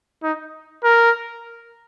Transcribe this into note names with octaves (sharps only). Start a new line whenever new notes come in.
D#4
A#4